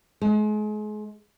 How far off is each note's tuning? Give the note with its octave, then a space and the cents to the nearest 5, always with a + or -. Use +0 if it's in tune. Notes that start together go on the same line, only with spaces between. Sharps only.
G#3 +35